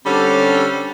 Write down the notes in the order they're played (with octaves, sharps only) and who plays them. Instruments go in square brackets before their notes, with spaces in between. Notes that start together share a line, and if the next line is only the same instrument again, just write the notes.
[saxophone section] D3 G3 C4 C#4 G4 A4